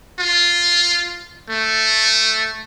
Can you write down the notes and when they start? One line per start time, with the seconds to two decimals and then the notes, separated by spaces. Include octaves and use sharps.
0.19 F4
1.50 A3